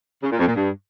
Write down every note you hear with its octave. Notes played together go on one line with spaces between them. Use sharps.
C#3
A#2
F2
A#2
G2